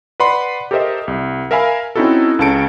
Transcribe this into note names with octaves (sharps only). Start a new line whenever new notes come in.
B4 D5 F#5 B5 C6
G4 A4 A#4 C5 D#5 E5
C2
A#4 E5 F5 G#5 B5
C4 C#4 D#4 E4 F#4 A4
C#2 C#3 A4 A5 C#7 D7